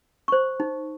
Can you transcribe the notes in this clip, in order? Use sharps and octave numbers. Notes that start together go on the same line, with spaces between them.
C5 C#6
D#4